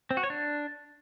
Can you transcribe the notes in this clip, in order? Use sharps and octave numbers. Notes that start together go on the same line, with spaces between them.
C4
F#4
C#5
D4